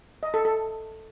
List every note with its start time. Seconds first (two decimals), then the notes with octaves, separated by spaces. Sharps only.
0.23 D#5
0.34 A4
0.45 A4